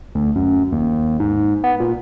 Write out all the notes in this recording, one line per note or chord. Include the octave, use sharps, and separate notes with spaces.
D2
F#2
D#2
G#2
B3
A#2